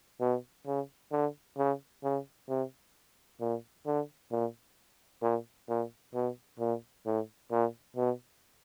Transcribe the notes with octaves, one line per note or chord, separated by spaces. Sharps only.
B2
C#3
D3
C#3
C#3
C3
A#2
D3
A#2
A#2
A#2
B2
A#2
A2
A#2
B2